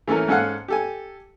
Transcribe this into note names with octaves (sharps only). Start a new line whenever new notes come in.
E3 A3 C#4 A4 A#4
G#2 C#4 A4 F5 F#5
G4 A4 G#5